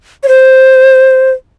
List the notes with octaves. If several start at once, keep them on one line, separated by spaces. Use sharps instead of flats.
C#5
C5